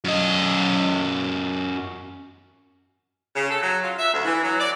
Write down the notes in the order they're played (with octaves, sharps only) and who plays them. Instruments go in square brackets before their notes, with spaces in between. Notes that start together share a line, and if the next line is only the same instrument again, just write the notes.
[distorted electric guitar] F#2 D#5
[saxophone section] C#3
A4
F#3
F4
E5
D2
E3
F#3
D5